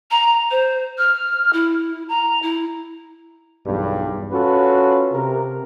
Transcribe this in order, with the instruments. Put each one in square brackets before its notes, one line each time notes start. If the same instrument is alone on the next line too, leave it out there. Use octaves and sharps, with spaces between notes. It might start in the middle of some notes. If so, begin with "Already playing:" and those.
[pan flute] A#5
C5
F6
E4
A#5
E4
[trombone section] B1 E2 G2
C#4 F4 F#4 A4 B4
C3 A#4